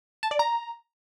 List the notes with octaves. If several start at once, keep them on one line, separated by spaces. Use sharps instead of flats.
A5
D5
A#5